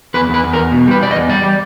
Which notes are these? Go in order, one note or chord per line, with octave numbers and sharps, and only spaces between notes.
E2 B4
E2
B4
E2
A#4
E2
B2
G3 B4
E2 D5
D#5
E2
G3 D5
G3